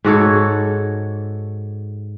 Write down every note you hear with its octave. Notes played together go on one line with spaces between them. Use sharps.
G#2 F#4 A4 C#5